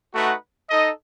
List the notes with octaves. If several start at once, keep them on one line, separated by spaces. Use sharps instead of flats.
A3 D#4 F#4 B4 F#5
D#4 A4 D#5